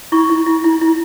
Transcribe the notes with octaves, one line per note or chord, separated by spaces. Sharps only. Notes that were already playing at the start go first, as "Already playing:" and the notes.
E4 C#6
E4
E4
E4
E4